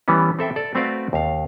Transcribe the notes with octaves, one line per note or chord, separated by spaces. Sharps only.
E3 G3 B3 C#4
C4 A4 E5 G5
A4 D5
A3 C4 F#4 B4 D5 F5
D#2 F5